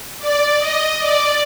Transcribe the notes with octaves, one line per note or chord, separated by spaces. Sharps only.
D5
D#5
D5